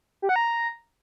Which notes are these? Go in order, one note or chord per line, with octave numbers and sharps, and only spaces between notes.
G4
F#5
A#5